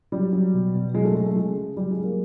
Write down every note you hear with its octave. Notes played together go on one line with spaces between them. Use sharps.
F#3 G3
F#3
B2
B2
F#3 G#3
A3
F#3 G#3
A3
C#3 G#3
C#3
F#3 G3
G#3
F#3
G#3 A#3